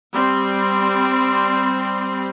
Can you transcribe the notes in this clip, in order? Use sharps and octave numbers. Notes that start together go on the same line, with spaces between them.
G3 C4